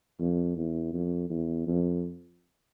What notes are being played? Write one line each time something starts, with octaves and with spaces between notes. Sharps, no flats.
F2
E2
F2
E2
F2